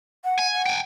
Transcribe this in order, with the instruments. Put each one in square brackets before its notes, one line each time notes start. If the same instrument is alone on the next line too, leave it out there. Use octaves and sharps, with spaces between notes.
[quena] F#5
[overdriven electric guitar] G#5
[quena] F#5
[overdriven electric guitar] G5 G#5